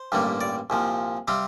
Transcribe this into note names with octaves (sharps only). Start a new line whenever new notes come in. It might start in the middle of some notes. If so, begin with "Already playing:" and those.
Already playing: C5
A1 G2 D3 G3 A#3
D5
C2 A#2 F3
C3 G3 C4 F5